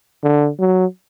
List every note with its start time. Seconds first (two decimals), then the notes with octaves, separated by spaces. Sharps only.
0.24 D3
0.60 F#3